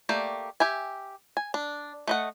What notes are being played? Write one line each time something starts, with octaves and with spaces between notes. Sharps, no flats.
A3 A#3 G4 D5
G4 E5 G#5
G#5
D4
A3 D#5 F#5